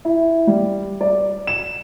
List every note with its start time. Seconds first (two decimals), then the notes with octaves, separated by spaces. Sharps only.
0.05 E4
0.47 G3
1.01 D5
1.47 E7